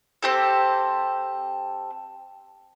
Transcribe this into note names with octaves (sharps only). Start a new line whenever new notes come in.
C4 G4 A4